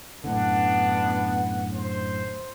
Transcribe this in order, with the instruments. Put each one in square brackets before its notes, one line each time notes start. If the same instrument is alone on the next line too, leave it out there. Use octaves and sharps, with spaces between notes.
[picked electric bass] F#2 A2 D3 [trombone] B3 [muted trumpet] D4 [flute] F#5
[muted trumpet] C5